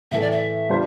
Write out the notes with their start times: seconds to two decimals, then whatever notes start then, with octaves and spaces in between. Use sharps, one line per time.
0.11 A2 E3 A3 E5
0.21 D5
0.32 E5
0.69 G3 D4 F4 C5